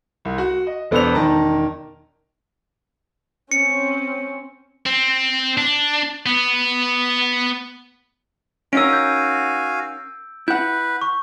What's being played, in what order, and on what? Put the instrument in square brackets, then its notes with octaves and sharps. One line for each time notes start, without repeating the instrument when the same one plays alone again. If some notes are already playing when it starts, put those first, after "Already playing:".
[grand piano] C2
F#4
D#5
E1 B3 A4 C5 D5 F7
E1 D#3 A5 A#5
[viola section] C4 C#4 [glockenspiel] C#7
[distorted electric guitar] C4
D4
B3
[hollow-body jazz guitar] C#4 D#4 A#4 [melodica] F#4 F5 G#5 [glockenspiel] E6 D7
[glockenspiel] G6
[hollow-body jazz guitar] E4 F#5 [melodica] B4 [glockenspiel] G6
[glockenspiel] C#6